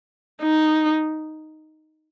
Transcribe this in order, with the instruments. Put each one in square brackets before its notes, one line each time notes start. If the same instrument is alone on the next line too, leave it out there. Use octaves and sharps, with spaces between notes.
[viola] D#4